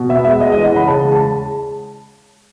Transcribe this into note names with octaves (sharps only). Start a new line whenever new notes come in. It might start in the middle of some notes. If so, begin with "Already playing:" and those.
Already playing: B2
B3 E5
G#3 E5
G#3 D#5
D#5
E3
F#5
C#3 B5
C#3 A5
G#3
A5